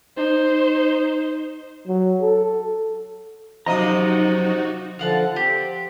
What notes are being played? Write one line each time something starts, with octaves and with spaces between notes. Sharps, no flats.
D#4 C5
F#3
A4
F#2 C3 F3 D#4 F#4 D#5 A#5
D3 F3 F4 F#5 A5
C4 G4